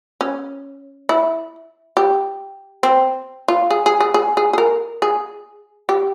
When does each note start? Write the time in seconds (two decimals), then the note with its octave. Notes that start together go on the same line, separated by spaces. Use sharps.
0.21 C#4
1.09 E4
1.97 G4
2.83 C4
3.48 F4
3.70 G#4
3.86 G#4
4.00 G#4
4.14 G#4
4.37 G#4
4.53 G#4
4.58 A#4
5.02 G#4
5.89 G4